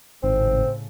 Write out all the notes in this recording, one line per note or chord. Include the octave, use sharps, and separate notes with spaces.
G#1 A2 C#3 C4